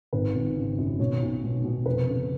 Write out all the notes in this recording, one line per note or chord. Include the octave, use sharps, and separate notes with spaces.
G#1 B4
G#1
C#3
F#2
B2 C#5
B1
B2
B2
F1 B4
C#3